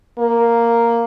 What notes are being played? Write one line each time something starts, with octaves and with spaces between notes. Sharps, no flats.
A#3